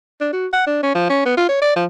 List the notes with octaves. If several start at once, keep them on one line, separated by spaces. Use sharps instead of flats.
D4
F#4
F#5
D4
C#4
F3
C#4
B3
F4
C#5
D5
F3